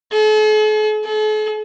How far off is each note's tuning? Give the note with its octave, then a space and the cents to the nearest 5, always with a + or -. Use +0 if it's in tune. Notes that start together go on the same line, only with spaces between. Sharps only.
A4 -45
A4 -45